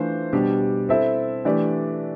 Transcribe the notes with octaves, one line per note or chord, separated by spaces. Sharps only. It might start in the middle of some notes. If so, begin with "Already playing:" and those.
Already playing: E3 A3 D4 F4 C5
B2 G3 D4 G4
C4 E4 A4 E5
E3 A3 D4 G4 D5